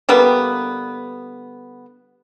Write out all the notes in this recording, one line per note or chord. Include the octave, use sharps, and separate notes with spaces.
D3 G3 A#3 B3